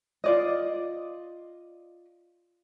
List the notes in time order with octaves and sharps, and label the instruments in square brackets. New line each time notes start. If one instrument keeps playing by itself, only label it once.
[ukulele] F4 D5 D#5